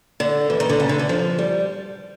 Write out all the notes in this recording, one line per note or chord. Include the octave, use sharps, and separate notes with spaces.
D3
E3
D#3
D3
C#3
D3
D3
F3
G3